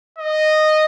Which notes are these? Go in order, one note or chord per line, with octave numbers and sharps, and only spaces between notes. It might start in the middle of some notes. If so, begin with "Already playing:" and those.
D#5